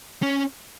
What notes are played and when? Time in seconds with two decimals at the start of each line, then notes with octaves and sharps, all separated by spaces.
0.22 C#4